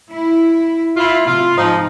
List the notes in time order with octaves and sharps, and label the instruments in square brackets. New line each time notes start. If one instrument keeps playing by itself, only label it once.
[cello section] E4
[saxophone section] E4 F4 [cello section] E5
[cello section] C3 [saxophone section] F4
[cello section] G#2 [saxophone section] F3 D#4